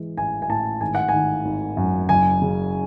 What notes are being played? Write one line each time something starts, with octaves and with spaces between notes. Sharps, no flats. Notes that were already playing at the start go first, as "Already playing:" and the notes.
Already playing: E3 G#3
A1 G#5
G#5
A2 A5
G#1 G#5
F#5
D#3 G#5
G#1
F#2
F#1 G#5
C#3